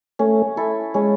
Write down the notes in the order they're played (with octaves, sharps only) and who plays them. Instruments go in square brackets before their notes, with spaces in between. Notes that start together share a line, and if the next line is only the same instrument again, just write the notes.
[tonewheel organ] A3 [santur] C#4
[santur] E4 A4
[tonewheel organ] G#3 [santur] C#4